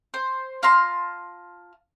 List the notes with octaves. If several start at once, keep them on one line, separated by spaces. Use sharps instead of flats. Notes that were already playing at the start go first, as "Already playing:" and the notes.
C5
F4 A5 A#5 C6